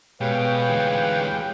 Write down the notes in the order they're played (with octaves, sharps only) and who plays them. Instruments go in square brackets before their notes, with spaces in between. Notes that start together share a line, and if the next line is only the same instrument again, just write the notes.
[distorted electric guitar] B2 [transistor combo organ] G#3 G4 G5 [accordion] B4 C#5 F5
[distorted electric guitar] D2 E3